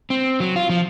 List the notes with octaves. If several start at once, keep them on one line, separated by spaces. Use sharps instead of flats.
C4
F#3
F4
F3